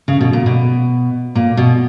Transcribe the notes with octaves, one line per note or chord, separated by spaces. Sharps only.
C#3
B2
A#2
B2
A#2
B2